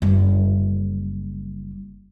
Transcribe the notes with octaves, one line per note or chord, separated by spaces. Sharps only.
F#1 G3